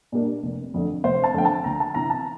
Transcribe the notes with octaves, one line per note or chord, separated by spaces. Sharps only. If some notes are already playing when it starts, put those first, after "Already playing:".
A#2 G3 A#3 D4
F1
F2 D3 A3
F1 C5
A5
F2 D3 A3 G5
A5
D2 A#5
A5
C3 E3 A#5
A5